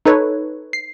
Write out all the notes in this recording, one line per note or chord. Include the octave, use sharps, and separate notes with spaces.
D#4 A4 B4 C#5
C7